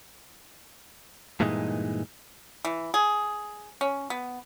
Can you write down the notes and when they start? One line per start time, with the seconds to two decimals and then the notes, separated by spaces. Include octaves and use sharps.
1.40 G2 A#2 E3 G#3 C#4 D#4
2.65 E3
2.94 G#4
3.81 C#4
4.10 B3